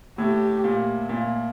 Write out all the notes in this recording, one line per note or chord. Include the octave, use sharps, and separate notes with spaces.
A2 G4
A#2
A#2